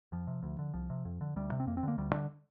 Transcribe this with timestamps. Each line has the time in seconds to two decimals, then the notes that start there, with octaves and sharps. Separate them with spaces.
0.12 F2 F3
0.27 C3
0.43 D2
0.59 D3
0.74 C2 F3
0.90 C3
1.05 F2
1.21 D3
1.36 D2 G3
1.52 C3
1.60 C4
1.67 F2 A#3
1.77 C4
1.83 D3 A#3
1.98 D2 G3
2.13 D3